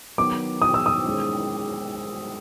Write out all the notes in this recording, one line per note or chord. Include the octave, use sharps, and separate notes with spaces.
D#3 F#3 B3 D6
D#6
E6
D#6
D#3 G#3 C#4